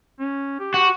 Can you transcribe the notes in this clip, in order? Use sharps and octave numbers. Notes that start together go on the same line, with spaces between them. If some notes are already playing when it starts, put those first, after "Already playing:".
C#4
G4
F#4